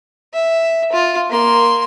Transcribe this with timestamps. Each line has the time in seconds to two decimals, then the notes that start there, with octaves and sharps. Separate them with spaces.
0.34 E5
0.92 F4
1.30 A#3 C6